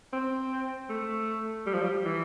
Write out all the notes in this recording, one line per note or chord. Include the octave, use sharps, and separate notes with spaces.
C4
A3
G3
F3
G3
E3